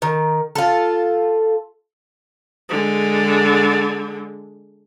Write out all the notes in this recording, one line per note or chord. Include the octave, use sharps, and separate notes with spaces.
D#3
F4 A4
D3 G#3